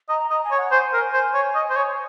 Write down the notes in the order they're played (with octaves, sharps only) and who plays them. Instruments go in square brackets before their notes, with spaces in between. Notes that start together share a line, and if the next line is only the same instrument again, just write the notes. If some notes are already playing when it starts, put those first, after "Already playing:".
[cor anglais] D#5 [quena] A#5
[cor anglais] D#5 [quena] A#5
[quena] G#5
[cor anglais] C#5
[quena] F#5
[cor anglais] C5 [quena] G#5
[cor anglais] A#4
C5
C#5
D#5
C5
C#5